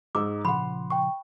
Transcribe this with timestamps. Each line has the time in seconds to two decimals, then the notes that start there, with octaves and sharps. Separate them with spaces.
0.15 G#2 D#4 D6 E6
0.45 A#2 C#3 F3 F#5 B5 C6
0.90 G5 C#6